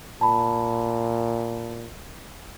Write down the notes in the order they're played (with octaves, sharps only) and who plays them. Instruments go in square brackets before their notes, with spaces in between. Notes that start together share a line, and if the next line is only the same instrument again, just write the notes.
[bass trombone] A#2 [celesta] A5 B5